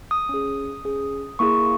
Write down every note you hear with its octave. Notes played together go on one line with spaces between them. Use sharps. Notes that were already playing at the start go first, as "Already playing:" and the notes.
D#6
C#4 G#4
C#4 G#4
A#3 E4 G#4 C#6